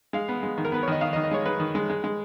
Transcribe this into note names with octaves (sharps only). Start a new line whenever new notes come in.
G#3 F5
B3
G#3
D#3
A#4
B3 B4
C#5
D#3 D#5
D#3 F5
D#5
D#3
D#5
G#3 C#5
G#3 B4
D#3
G#3
G#3
G#3